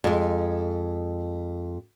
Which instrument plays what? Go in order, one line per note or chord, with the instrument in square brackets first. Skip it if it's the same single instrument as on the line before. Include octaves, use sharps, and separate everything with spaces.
[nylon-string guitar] F2 G#3